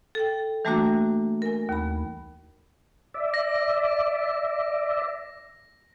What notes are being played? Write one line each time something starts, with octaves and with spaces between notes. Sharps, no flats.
A4 G5
E3 G3 A3 A#3 D4 F#4
A#4 G#5
D#2 B5
D5 E5
A#6